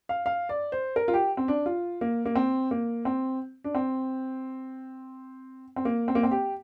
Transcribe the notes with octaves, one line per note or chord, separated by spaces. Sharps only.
F5
F5
D5
C5
A#4
F4
G4
C4
D4
F4
A#3
A#3
C4
A#3
C4
D4
C4
C4
A#3
C4
A#3
C4
G4